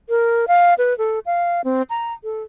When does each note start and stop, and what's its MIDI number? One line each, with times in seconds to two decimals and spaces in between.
0.09 0.45 70
0.48 0.74 77
0.78 0.96 71
0.98 1.19 69
1.26 1.61 77
1.64 1.82 60
1.90 2.13 82
2.24 2.43 69